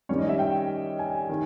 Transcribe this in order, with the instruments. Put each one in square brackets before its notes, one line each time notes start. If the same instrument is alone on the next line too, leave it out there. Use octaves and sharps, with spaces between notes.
[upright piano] D#3 G3 C#4 C#5
D#5
E5
G5
G#5
D#3